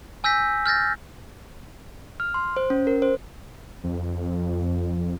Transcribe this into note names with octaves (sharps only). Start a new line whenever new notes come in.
G#5 E6 G6 A#6 B6
F6 G6 A6 A#6
F6
C6
C5
C#4
A#4
C5
F2